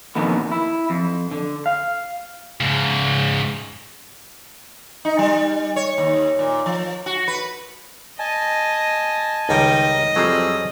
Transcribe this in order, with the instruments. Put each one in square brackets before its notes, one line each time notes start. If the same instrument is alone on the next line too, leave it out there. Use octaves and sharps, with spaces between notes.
[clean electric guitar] F2 A#2 D3 D#3 B3
E4
F2
D3
F5
[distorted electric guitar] G#2 C#3
[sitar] D#4
G3
C#5
D#2
A#2
F3
F#4
B4
[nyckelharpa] D#5 [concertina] G#5 A5
[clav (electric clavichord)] C#2 G3 G5 [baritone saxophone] D#3 [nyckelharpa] D#5
[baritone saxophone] F2 [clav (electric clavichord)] F#3 G3 C5 [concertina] G#4 E6